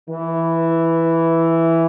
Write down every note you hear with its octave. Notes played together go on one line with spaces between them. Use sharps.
E3